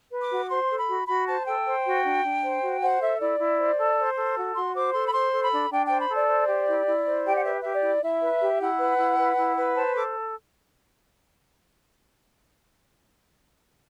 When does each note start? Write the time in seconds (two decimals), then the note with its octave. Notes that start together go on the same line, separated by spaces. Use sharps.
0.12 B4
0.21 D6
0.31 F#4
0.50 C5 C6
0.69 A4
0.79 B5
0.89 F#4
1.08 F#4 B5
1.27 C5 A5
1.46 A4 G5
1.66 C5
1.85 F#4
2.04 D4
2.24 D4
2.43 C5
2.62 F#4
2.81 C5 F#5
3.01 A4 E5
3.20 E4 D5
3.40 E4
3.59 C5
3.78 A4
3.97 C5
4.17 A4
4.36 F#4
4.55 F#4 C6
4.74 C5 D6
4.93 A4 C6
5.07 B5
5.13 C5 C6
5.32 A4
5.42 B5
5.51 D4
5.70 D4 G5
5.86 C5 G5
5.99 B5
6.09 A4 D5
6.29 C5
6.48 G4
6.68 E4
6.87 E4
7.06 C5
7.25 G4 G5
7.36 F#5
7.44 B4 E5
7.61 G4 E5
7.73 D5
7.82 E4
8.02 E4 E5
8.21 B4
8.41 G4
8.60 E4 F#5
8.79 B4
8.98 E4
9.18 B4
9.37 E4
9.56 B4
9.75 C5 A5
9.95 A4 D6